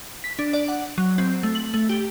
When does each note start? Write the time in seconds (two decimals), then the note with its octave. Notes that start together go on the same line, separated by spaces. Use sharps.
0.24 B6
0.39 D4
0.53 D5
0.68 F#5
0.98 F#3
1.18 C4
1.43 A3
1.55 F#7
1.74 A3
1.89 G4